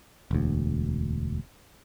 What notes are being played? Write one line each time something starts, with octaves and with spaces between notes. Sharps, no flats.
E1 D2